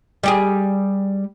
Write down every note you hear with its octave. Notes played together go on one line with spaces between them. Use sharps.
G3 G4 G#4